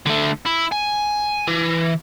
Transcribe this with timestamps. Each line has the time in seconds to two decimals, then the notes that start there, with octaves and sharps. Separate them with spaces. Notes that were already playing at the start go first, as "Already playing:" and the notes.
0.06 D3 A3
0.45 E4
0.72 G#5
1.48 E3